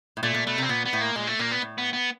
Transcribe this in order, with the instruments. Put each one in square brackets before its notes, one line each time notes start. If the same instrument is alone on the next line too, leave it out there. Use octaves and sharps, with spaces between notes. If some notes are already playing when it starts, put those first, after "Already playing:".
[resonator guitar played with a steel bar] A2
[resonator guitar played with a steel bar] A#2 [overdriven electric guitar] A3
[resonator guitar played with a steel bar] A#2
[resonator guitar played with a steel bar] B2 [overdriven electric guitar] A3
[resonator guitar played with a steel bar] C3
[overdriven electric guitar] C4
[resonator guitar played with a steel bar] A#2 [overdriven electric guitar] B3
[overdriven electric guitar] B3
[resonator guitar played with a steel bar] A2
[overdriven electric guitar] A#3
[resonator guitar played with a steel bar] A#2 [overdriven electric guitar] G#3
[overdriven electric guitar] A3
[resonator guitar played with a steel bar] A#2 [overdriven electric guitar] A#3
[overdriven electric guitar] B3
[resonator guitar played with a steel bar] A2
[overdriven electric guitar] B3
B3